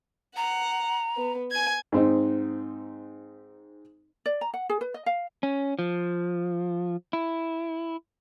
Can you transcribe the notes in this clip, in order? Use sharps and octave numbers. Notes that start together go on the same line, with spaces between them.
F#5 A#5
B3
G#5 G#6
G#2 C4 D#4
D5
A#5
F#5
G#4
B4
D#5
F5
C#4
F3
E4